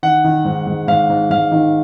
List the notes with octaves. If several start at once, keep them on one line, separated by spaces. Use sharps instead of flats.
D#3 F#5
D#3
G#2
G#2
G#2 F5
G#2
G#2 F5
D#3